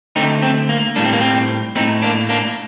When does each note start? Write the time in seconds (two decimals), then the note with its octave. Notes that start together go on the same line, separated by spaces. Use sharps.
0.16 D3 A3 C4 D#4
0.42 C4
0.69 A#3
0.96 A2 G3 A#3 D4
1.04 C4
1.13 A#3
1.21 C4
1.76 A2 A3 C4 D#4
2.02 A#3 D4
2.29 A#3 D4